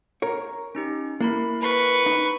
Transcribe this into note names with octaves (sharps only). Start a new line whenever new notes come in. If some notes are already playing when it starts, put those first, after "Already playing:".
A#4 C#5
C#4 D#4 G4
A#3 E4 A#4 B5
B4 C#6
D#4